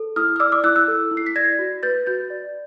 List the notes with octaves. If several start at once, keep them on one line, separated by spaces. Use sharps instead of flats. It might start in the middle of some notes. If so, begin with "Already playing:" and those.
Already playing: A4
E4 D#6 F6
F6
D5 D6 E6
D6 E6
E4 E6 F#6
E6 F#6
A4
E4
C7
B6
D5 G#6 A#6
F#4
B4 G6 A6
F#4 G6 A6
D5